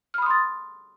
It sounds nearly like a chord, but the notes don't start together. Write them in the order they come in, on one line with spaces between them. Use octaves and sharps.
F6 B5 D#6 C6 A6